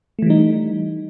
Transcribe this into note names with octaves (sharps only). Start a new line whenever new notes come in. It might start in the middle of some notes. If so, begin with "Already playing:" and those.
E3 G3 A3 D#4